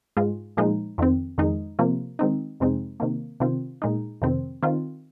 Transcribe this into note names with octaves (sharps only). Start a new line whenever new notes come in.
G#2 G#3 F4
A#2 F3 G#3 D#4
F2 D#3 C4
F2 D#3 G#3 D#4
C3 F3 A#3 F4
D#3 G#3 C4 D#4
F2 C3 G#3 C4 D#4
C3 D#3 A#3
C3 D#3 C4 F4
A#2 G#3 D#4
F2 C3 D#3 C4
D#3 C4 F4